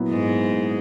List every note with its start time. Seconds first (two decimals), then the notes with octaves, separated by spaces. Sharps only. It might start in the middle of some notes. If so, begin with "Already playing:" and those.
Already playing: A#2 F#3 B3 E4
0.09 G#2 G#3